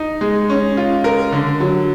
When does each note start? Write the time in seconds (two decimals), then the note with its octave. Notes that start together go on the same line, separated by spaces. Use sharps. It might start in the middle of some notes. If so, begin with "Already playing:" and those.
Already playing: D#4
0.21 G#3
0.49 C#4
0.77 F4
1.04 A#4
1.32 D3
1.60 F#3